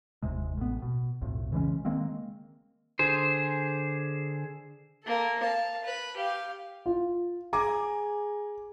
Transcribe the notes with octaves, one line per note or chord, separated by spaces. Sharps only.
F#1 D#2 C3 G#3
A1 B3
B2
B1 F2 A2
C#3 E3 G#3 C#4
D#3 G#3 A#3 C4
D3 G#4 C5
A#3 A4
F5 A5
B4
G4 F5
F4
G#4 A#5 D6